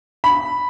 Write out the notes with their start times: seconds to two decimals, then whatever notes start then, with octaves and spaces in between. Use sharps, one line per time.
0.24 B5